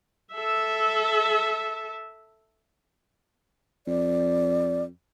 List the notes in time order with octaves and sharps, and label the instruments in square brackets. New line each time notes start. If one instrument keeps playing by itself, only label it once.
[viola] A4 E5
[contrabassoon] F2 [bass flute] D5